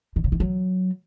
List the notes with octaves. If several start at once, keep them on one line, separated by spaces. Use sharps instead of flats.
D#3
C#3
D#3
F#3